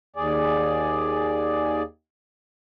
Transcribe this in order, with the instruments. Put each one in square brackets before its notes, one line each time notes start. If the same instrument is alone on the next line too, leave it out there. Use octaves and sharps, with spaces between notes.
[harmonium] D#2 G#4 D5